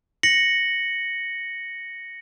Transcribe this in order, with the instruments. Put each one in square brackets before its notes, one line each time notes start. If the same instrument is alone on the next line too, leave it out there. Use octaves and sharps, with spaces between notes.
[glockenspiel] A#6 C#7 F#7